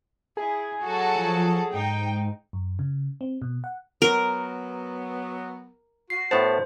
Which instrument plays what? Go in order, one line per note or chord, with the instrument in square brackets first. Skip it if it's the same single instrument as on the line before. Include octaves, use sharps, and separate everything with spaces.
[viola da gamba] E4 [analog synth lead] G#4
[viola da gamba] F#3 A4 [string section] F#4 A5
[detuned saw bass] F3
[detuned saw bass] G#2 [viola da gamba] D#4 [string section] G5
[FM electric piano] F#2
C#3
C4
B2
F#5
[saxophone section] F#3 B3 [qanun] A#4
[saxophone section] F#4 [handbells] C7
[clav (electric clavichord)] A2 B3 A5 [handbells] C5